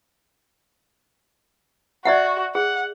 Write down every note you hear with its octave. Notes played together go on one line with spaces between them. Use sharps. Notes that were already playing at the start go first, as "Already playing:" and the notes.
F#4 D5 E5 F#5
G#4 F#5